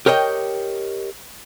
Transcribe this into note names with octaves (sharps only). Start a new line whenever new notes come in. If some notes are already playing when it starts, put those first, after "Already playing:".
G4 A#4 C#5 D#5 G5